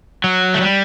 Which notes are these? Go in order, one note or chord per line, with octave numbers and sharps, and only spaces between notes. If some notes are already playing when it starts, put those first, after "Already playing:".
F#3
A3
G3